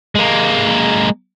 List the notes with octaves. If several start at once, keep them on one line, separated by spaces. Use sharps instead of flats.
G#3 A#3